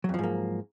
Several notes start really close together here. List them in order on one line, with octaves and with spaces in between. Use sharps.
F#3 F2 F3 G#2 A#3